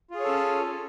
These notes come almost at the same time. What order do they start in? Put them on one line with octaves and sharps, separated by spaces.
F4 G#4 C#5 A4 C#4